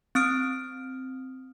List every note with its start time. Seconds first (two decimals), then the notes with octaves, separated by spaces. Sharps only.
0.15 C4 D#6 F6 D7